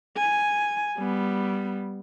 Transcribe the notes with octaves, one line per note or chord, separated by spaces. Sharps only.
G#5
G3 B3